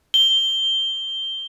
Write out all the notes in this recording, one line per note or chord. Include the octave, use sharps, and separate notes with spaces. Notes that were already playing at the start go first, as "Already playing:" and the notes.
G7